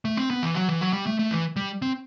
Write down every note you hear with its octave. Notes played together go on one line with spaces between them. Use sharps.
A3
C4
B3
E3
F#3
E3
F#3
G3
A3
A3
E3
G3
C4